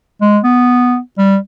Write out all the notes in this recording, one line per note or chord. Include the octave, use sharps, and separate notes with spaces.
G#3
B3
G3